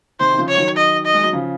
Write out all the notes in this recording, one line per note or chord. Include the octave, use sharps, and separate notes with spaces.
C3 D#3 C5
D#3
C#3 F3
C#5
D#3 F#3
D#5
D#5
G#3
F#3
C#3 F3